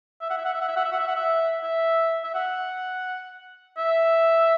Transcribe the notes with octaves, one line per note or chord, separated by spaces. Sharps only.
E5
F#5
E5
F#5
E5
F#5
E5
F#5
E5
F#5
E5
F#5
E5
E5
E5
F#5
E5